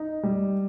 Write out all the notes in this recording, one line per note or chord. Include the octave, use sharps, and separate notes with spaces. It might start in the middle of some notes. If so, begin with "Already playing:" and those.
Already playing: D#4
G3